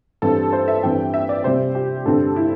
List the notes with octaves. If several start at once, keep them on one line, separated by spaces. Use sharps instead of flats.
G2 E3 C4 A4
C5
E5
G2 E3 C4 G5
E5
D5
C3 G3 C4 C5
G4
G2 D3 C4 A4
E4